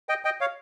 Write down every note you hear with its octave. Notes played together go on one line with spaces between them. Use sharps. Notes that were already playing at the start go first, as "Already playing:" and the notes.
D#5 G5
D#5 G5
C#5 F5